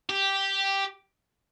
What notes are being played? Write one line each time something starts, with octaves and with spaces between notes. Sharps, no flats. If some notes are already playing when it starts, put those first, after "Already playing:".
G4